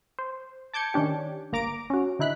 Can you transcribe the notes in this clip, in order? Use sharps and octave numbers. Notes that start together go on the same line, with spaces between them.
C5
A5 D6 G6 G#6 C#7
D#3 C#4 D4 G4
G1 A#3 A#5 D6 A#6 D7
C#4 F#4
D3 D#4 E4 F#6 B6